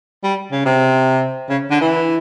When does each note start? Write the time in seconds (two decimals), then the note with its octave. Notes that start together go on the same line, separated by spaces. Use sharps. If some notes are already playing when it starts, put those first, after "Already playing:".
0.24 G3
0.51 C#3
0.65 C3
1.49 C#3
1.70 D3
1.81 E3